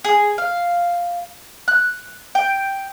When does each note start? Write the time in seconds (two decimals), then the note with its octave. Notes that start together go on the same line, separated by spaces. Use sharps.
0.04 G#4
0.38 F5
1.68 F#6
2.35 G5